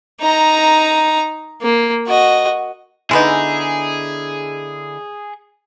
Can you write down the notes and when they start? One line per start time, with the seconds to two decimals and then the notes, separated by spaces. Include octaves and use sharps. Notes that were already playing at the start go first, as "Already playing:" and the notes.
0.21 D#4 A#5
1.62 A#3
2.07 F#4 D#5
3.11 D3 G#3 B3 D#4 E4 G#4